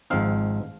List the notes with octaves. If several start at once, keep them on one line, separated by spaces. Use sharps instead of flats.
G#1 G#2 F3 C4 D#4 F5